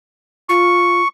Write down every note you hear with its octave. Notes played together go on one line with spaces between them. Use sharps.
F4 C#6